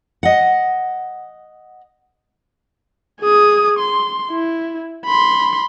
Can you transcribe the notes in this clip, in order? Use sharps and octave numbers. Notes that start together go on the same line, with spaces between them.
D#5 F#5
G#4 D#6
C6
E4
B5 C6